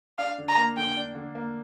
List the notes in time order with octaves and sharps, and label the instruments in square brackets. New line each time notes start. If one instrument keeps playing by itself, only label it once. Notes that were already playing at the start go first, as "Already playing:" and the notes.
[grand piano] D4 [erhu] F5
[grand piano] D3
[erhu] A#5
[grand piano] A#3
[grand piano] D3 [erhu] G5
[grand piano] D4
D3
A#3